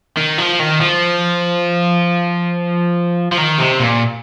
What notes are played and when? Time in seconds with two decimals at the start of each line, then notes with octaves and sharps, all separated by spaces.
0.17 D#3
0.38 F3
0.60 D#3
0.81 F3
3.32 F3
3.38 D#3
3.59 C3
3.80 A#2